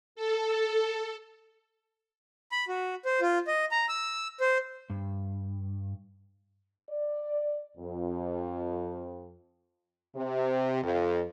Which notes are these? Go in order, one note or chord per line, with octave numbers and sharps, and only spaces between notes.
A4
B5
F#4
C5
F4
D#5
A#5
E6
C5
G2
D5
F2
C3
F2